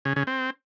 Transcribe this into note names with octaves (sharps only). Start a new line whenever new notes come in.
C#3
C#3
C4